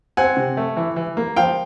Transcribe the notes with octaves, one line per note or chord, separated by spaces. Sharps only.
C4 F#5 G#5
C3
A3
E3
E3
A#3
F3 F5 G5